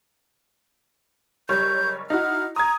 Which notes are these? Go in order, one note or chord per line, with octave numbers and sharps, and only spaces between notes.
F#1 G3 C#5 G6
D#4 E4 F#4 F6
A#5 D#6 G#6